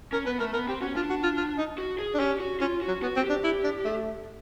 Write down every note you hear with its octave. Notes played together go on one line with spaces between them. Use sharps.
C#4 A#4
B3 B4
A3 A#4
B3 A#4
C4 G4
C#4 F#4
D4 F4
F#4
F4
F4
D#4
F#4
G#4
D4
C#4 G4
F#4
C#4 F4
F#4
F#3
B3 F#4
C4
G4
D4
E4
D4
A3